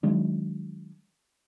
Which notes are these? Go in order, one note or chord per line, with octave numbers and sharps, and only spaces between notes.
D#3 F#3 G#3 D4